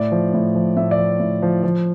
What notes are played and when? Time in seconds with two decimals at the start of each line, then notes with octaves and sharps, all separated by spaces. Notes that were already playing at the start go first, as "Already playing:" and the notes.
Already playing: A2 D5
0.11 F3
0.34 A2
0.55 F3
0.77 A2 E5
0.91 D5
0.99 F3
1.20 A2
1.42 F3
1.64 F3